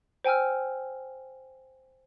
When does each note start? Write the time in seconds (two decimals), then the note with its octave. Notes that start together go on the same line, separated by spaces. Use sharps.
0.24 C5 G5 G#5 E6 F6